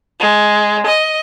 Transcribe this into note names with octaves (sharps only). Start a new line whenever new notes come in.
G#3
D#5